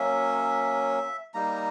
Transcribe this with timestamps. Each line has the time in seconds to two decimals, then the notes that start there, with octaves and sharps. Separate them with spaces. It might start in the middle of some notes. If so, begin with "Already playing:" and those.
Already playing: F#3 A#3 C#4 E5
1.34 G3 A#3 D#4 A#5